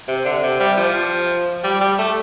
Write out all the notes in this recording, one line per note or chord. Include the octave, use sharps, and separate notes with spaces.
C3
D3
C3
G3
F3
G3
G3
A3